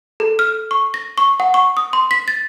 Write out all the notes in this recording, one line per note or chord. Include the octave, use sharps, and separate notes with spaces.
A4
F6
C#6
A#6
C#6
F#5
C#6
D#6
C6
B6
A6